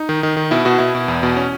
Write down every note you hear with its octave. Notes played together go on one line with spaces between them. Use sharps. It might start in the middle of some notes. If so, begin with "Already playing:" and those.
Already playing: D#4
D#3
D#3
D#3
B2 E4
B2 F#4
B2 E4
B2
E2
B2
C#4